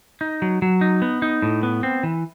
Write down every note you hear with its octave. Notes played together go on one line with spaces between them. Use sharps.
D#4
F#3
F#3
D#4
B3
D#4
A2
B3
C4
E3